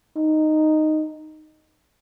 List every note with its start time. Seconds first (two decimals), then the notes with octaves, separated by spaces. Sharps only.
0.16 D#4